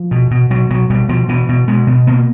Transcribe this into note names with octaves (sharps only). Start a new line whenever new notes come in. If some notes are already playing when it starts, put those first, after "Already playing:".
Already playing: F3
B2
B2
B2 F#3
B2 F#3
B2 G3
B2 F3
B2 E3
B2
B2 G#3
B2
B2 A#3